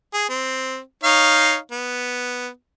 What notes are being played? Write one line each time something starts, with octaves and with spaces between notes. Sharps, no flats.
G#4
C4
D#4 C#5 F5
B3